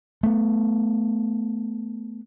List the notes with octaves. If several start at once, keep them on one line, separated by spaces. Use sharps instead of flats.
A3 B3